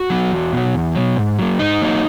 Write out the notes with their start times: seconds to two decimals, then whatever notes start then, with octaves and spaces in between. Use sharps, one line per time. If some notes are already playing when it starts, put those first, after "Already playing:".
Already playing: F#4
0.10 F#3 B3
0.32 E2
0.53 B2 F#3
0.74 E2
0.95 B2 F#3
1.16 G#2
1.39 F#3 A#3
1.59 G#2 D#4
1.82 F#3 A#3